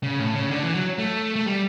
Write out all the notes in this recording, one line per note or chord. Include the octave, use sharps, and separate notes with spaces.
C#3
A2
C#3
D3
E3
F#3
A3
A3
G3